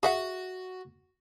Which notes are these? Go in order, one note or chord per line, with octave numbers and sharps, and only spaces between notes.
F#4 G#4 E5 F#5